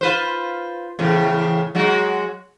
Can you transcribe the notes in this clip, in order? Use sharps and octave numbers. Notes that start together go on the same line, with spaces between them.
F4 B4 C5
E2 A2 C#3
F#3 G#3 F#4